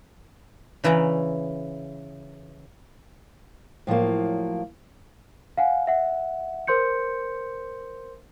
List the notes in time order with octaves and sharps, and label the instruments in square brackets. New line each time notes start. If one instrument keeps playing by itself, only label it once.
[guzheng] C#3 E3 E4 D5 A#5
[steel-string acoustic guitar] A2 F3 F#3 A#3
[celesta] F5 F#5 G#5
E5 F#5
A#4 C5 C6 G6 C#7